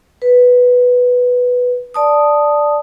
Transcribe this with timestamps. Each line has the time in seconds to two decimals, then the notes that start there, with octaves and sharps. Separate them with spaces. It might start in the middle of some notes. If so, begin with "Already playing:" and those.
0.22 B4
1.94 D5 A5 D#6